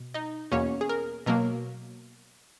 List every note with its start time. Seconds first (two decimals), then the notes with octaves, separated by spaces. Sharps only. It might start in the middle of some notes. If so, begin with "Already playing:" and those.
Already playing: B2
0.14 D#4 D#5
0.52 E2 B2 A#3 C#4 C#5
0.81 G#4
0.89 A#4
1.26 B2 F#3 A#3 A#4